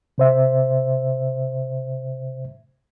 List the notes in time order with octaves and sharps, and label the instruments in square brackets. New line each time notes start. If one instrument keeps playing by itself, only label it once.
[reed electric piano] C3 C5 E5